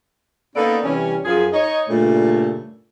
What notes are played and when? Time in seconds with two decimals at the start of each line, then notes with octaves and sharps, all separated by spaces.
0.56 A#3 B3 C#4 D#4 A4 D5
0.84 C3 E3 G3 C#4
1.25 F#2 F3 G#4
1.53 D#4 C#5 D#5
1.89 G2 A#2 C#3 A3